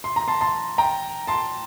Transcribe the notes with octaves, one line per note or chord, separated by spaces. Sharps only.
C6
A#5
A5 C6
A5 C6
G5 A#5
A5 C6